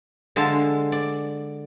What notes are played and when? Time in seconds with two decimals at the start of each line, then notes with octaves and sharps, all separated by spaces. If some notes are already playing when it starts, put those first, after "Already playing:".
0.36 D3 G#3 A4 F5 A5
0.92 D5